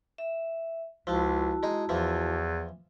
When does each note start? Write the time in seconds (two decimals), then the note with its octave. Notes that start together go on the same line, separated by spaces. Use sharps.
0.18 E5
1.07 C#2 F3 E4 F#4 A5
1.63 G#3 D#4
1.89 E2 E3 F3